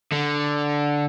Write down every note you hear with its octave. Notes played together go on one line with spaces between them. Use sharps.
D3